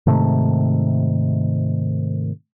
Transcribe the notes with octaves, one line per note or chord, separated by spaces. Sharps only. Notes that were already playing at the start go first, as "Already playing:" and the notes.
G#2 C3 D#3 A3